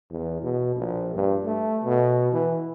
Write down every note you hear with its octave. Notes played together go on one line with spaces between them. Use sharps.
E2
B2
A#1
G2
A3
B2
E3